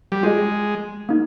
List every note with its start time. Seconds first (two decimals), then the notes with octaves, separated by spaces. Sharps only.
0.12 G3
0.23 G#3 F4 G#4 D#5
1.09 A#3 D#4